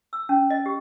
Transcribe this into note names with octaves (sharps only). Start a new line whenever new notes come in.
E6
C#4
D#5
G4